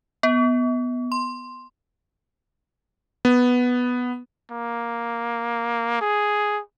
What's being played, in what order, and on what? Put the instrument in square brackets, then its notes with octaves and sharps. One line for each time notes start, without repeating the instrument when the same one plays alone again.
[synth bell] B3
C6
[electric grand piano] B3
[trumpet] A#3
G#4